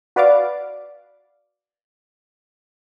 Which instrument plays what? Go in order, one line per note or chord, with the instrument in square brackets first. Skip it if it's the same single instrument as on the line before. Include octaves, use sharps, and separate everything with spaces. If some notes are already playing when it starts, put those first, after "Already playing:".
[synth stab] F#4 B4 D5 F5 D6